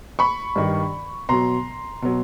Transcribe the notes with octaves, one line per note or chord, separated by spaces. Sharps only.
B5 C#6
G2 D#3 G3
B2 F#3 A#5 C6
B2 F#3